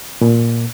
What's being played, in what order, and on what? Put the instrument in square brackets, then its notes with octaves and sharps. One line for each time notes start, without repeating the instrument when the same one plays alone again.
[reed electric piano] A#2